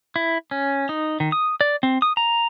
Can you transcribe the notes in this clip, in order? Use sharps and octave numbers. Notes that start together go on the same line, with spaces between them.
E4
C#4
D#4
D#3
D#6
D5
C4
D#6
A#5